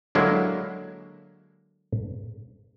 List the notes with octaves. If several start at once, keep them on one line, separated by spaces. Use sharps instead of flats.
D3 F#3 G#3 A#3 E4